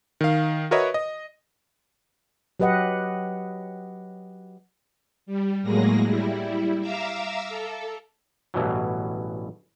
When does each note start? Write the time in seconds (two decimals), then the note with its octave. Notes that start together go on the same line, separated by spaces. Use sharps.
0.21 D#3 F5
0.71 F#4 A#4 B4 C#5 D#5 E5
0.94 D#5
2.60 F#3 G4 B4 D#5 F#5
5.26 G3
5.62 A2 F#3 G#3 A#3 G#4 A#6
6.05 G3 E4
6.81 E5 F5 A#5 D6 E6
7.49 A4
8.54 A1 G2 B2 E3 F#3